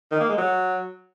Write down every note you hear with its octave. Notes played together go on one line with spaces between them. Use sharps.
D#3
A#3
G#3
F#3